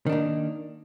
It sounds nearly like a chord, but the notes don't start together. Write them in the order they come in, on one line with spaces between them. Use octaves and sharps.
D#3 D4 A#3